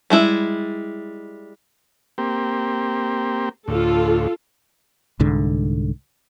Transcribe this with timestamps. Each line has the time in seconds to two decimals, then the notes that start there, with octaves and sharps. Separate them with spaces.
0.10 G3 G#3 E4
2.18 A#3 C4 G4
3.68 D2 A2 F4 A4
5.20 C2 G#2 D3